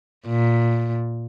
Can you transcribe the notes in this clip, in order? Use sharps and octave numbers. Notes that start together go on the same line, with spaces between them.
A#2